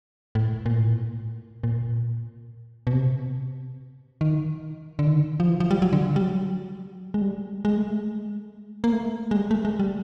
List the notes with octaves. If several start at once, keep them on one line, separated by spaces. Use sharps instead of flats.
A2
A#2
A2
A#2
B2
C3
D#3
D3
D#3
F3
E3
F3
G3
F#3
D3
G3
F#3
G#3
G3
G#3
A3
G#3
A#3
A3
G#3
G3
A3
G#3
G3